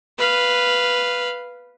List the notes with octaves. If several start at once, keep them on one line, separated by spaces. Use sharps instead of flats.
B4 F5